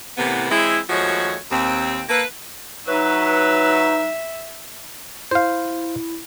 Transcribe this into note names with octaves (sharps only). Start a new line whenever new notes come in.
A2 C3 E3 A#3 B3
E3 G#3 C4 E4
D#2 F3 G#3 A3 F#4 C#5
D#2 C4
A#3 A4 B4
F#3 D#4 B4 E5
E4 C5 F5